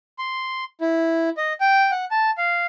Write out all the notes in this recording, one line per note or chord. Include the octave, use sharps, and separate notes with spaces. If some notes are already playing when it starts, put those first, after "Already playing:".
C6
E4
D#5
G5
F#5
A5
F5